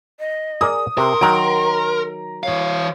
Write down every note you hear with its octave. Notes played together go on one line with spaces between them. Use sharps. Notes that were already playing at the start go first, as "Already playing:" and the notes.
D#5
G#4 A#4 D5 D#6
C3 A#4 C6
D#3 F#3 A#5 D7
E3 C#5 F5